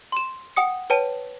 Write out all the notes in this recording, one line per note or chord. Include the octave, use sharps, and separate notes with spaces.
C6 E7
F#5 G5 D#6 C#7
B4 C#5 G5 A5 D#7